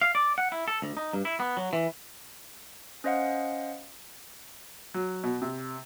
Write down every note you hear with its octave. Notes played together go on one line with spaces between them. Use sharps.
F5
D5
F#5
E4
A4
D2
D#4
G2
E4
B3
F#3
E3
C#4 C5 D#5 F5 F#5
F#3
B2
C3